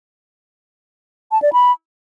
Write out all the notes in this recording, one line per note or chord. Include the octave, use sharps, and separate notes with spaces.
A5
D5
B5